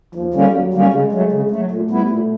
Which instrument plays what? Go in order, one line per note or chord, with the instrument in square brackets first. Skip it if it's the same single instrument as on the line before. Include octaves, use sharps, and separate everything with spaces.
[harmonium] D#2 [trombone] F3
[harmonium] D3 G3 A#3 C#4
[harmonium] D#2 [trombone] F#3
[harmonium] D3 G3 A#3 C#4
[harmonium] C#3 [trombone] G#3
[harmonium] F#3 A3
C#3
F#3 A3
[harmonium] A#2 [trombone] A3
[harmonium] G3 B3 E4
A#2